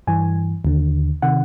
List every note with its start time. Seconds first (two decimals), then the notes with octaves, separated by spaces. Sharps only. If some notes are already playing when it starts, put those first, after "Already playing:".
0.07 G2 E3 G#5
0.65 D#2 D3
1.22 C3 D#3 F#5